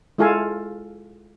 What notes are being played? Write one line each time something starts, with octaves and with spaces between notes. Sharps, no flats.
G#3 E4 F4 A4 F5 G#5